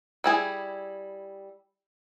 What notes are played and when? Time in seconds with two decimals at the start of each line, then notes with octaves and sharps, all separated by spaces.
0.24 G3 E4 G#4